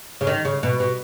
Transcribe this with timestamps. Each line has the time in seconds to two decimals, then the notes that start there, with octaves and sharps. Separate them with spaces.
0.21 C#3
0.27 D#3
0.45 C#3
0.63 B2
0.80 B2